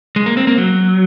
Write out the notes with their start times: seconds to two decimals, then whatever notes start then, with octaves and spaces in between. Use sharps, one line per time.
0.16 G#3
0.26 A#3
0.37 C4
0.47 A#3
0.58 F#3